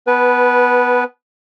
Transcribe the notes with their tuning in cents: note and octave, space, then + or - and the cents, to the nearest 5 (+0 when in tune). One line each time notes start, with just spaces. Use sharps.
B3 +10 B4 -10 A5 -45